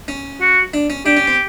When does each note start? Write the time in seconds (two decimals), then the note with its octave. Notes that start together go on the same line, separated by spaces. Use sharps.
0.08 C#4
0.41 F#4
0.74 D4
0.90 C#4
1.06 D4 G4
1.17 C#4
1.28 C4